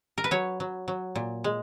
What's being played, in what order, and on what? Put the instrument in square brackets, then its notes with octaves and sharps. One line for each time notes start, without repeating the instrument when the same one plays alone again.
[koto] A#4
B4
F#3 C#5
F#3
F#3
A#2
G#3